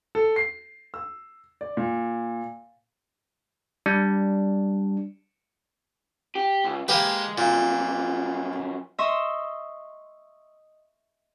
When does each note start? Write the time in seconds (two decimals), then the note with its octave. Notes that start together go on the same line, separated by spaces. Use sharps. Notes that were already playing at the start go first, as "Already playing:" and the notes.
0.15 A4
0.36 C7
0.94 E6
1.61 D5
1.77 A#2
3.86 G3 D4
6.35 G4
6.64 C#2
6.88 G#3 A#3 G4 B4
7.38 F#2 A#2 F3
8.98 D#5 E5 C6 C#6 E6